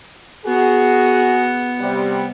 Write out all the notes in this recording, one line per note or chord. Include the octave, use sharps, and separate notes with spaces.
B3 F#4 G#4 F#5
C3 G3